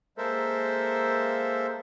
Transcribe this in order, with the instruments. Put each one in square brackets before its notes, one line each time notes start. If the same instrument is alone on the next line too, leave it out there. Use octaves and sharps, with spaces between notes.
[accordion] G#3 A#3 A4 A#4 C5 E5